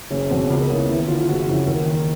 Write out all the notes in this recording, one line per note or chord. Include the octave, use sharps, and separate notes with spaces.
F#1 C#4
E2 B2 C4
C#2
A#3
C#3 E3 B3
D#2 E4
D3 F4
F4
F#1 F#4
F2 C#3 E3
D#2 A#4
D#3